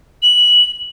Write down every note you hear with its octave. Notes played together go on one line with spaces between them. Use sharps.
F#7